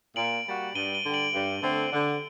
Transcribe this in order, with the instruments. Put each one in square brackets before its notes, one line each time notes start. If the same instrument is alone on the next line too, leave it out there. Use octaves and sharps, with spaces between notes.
[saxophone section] A#2 [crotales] D7 F#7
[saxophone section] G3 A#3 F#4
[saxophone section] G2 [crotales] D#7 G7
[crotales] D#7 G7
[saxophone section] D3 G3
[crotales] D7 F#7
[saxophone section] G2
D3 A3 C4
D3